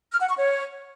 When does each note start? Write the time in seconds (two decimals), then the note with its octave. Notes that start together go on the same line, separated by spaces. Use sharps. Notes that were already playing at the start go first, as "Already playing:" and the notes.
0.11 F6
0.20 F#5
0.28 C#6
0.37 C#5